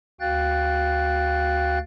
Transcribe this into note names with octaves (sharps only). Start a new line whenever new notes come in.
D2 F#4 F5 G5 F#6 A6